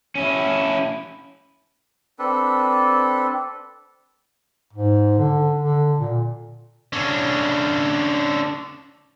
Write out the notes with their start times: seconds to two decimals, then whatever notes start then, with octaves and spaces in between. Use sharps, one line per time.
0.15 C#4 E4
2.19 C4 D4 A4 B4
4.73 G#2
5.18 D3
5.62 D3
5.99 A#2
6.93 D3 C#4